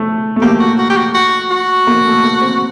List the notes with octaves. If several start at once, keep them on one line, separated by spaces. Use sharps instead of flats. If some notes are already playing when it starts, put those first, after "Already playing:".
Already playing: A3
A3
A#3 G4
F#4
F#4
G4
F#4
F#4
F#4
A#3
A3
A#3
C4